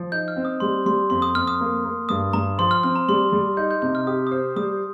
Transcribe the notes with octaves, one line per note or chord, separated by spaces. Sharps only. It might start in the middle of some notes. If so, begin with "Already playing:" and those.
Already playing: F3
D#4 G6
F6
C4
D#6
G3 C6
G3 C6
F2 C6
D#6
F2 F6
D#6
A#3
A#3
G2 D#6
G2 A#5
F3 C6
F6
C4 F6
A#5
G3 C6
G3
D#4 G6
G6
C3 G6
F6
G4 D#6
D#6
C5 F6
G3 D#6